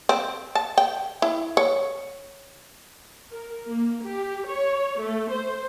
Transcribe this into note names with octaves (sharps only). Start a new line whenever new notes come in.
C4
A5
G5
E4
C#5
A#4
A#3
G4
C#5
A3
C5